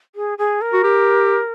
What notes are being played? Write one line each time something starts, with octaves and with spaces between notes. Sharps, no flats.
G#4
G#4
A#4
F#4
G4